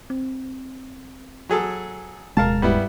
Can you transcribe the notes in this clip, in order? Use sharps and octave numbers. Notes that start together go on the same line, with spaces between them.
C4
F#3 G#4 A4
D1 B2 G#3 A#4 F5 A5
G2 G3 B3 E4